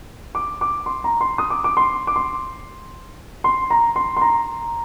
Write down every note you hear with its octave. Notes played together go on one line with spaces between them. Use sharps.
D6
D6
C6
A#5
C6
D#6
D6
D6
C6
D6
C6
C6
A#5
C6
C6
A#5